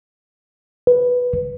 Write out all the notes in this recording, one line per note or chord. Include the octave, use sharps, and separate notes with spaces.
B4